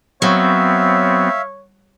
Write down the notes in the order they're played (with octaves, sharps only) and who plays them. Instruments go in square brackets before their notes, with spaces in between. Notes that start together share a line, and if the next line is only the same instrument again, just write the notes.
[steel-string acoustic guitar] F#3 [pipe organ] B3 C4 [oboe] C#5 [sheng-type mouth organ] E5 F5